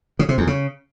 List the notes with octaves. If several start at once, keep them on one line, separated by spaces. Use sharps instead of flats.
C#3
C3
E2
C#3